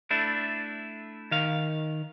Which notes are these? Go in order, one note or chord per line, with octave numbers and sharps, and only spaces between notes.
A3 D4 E4
D#3 F5